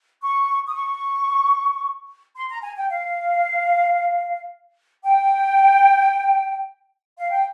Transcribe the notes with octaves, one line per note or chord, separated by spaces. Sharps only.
C#6
D#6
C#6
C6
A#5
G#5
G5
F5
G5
F5
G5